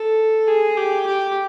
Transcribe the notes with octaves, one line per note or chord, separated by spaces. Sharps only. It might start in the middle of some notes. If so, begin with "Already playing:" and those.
Already playing: A4
G#4
G4
G4